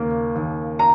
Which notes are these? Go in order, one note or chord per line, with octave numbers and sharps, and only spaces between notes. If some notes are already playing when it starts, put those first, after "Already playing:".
Already playing: D#2 C#3 A#3
D#2
A#5